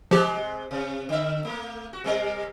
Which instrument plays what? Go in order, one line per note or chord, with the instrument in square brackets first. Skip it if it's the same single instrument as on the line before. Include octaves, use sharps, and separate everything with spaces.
[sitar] C3 G#3 [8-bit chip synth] F3 G4
[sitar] C3
D3 E5
A3 A#3
F#4
C3 G3 A#4